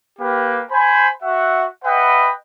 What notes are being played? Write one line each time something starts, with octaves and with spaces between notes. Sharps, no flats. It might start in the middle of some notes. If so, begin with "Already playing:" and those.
A#3 G4 B4
C5 G#5 B5
F#4 E5 F#5
B4 D#5 E5 F#5 G5 B5